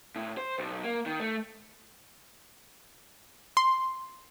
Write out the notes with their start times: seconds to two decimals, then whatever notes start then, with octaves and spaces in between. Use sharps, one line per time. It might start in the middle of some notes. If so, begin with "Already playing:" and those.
0.16 A2
0.37 C5
0.59 B1
0.84 A#3
1.06 D#3
1.20 A3
3.57 C6